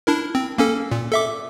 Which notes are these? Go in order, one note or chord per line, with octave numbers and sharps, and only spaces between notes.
D4 E4 A#4
C4
A#3 C#4 A4
A#2
A4 E5 D6